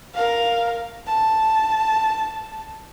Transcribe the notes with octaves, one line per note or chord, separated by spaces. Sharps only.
A#4 F5
A5